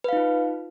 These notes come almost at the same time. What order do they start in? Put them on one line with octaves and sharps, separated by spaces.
B4 F5 D#4 F4